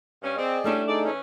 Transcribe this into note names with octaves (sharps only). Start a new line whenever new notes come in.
G2 C#4
C4 G#4 D5 D#5
G3 A3 C#4 D4 E4
D#4 G#4 A4 D5
E3 C#4